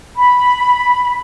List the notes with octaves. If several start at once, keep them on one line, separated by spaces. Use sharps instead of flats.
B5